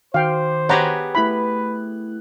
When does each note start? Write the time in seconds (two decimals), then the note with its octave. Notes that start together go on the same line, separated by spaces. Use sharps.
0.14 D#3 F#4 C5 F5 G5 D6
0.69 B3 G4 G#4 C#5 F#5 A#5
1.15 A3 E4 B4 B5 F#6